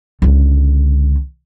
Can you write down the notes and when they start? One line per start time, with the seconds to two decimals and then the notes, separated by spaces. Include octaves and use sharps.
0.22 C#2 D3